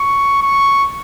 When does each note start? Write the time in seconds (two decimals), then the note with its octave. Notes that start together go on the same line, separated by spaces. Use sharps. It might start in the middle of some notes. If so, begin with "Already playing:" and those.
Already playing: C#6
0.42 C#6